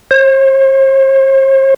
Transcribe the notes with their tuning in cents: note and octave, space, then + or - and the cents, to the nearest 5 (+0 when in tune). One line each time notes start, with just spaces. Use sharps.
C5 +45